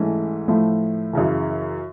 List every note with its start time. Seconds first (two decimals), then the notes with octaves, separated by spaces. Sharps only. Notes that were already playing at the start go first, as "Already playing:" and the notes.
Already playing: G#2 E3 A3 C#4
0.48 A2 F3 A3
1.13 F#2 C#3 E3